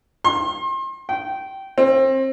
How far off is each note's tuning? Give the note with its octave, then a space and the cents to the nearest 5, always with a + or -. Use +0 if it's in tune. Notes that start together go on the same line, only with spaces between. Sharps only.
C6 +35
G5 -15
C4 +30